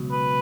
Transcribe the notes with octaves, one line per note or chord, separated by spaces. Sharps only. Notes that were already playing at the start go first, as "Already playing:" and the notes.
Already playing: C#2 B2 F#3
B4